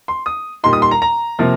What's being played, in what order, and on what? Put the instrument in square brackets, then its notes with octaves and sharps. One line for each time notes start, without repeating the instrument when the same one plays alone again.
[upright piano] C6
D#6
A#2 G3 A#3 D#4 C6
D#6
C6
A#5
A#5
C3 F3 A#3